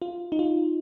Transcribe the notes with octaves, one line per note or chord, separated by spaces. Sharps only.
F4
D#4
F4